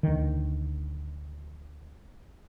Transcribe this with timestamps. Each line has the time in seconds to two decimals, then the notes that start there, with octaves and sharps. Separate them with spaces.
0.03 D2 D#3